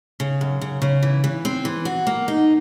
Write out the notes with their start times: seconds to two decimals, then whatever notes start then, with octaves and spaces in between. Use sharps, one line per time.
0.20 C#3
0.41 F#2
0.61 C#3
0.82 C#3
1.03 E3
1.24 E3
1.45 C4
1.65 E3
1.85 F#4
2.07 A#3
2.28 D#4